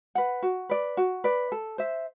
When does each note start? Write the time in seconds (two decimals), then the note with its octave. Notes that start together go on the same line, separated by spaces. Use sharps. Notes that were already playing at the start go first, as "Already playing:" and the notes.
0.15 B4 F#5
0.43 F#4
0.69 B4 D5
0.97 F#4
1.24 B4 D5
1.52 A4
1.78 C5 E5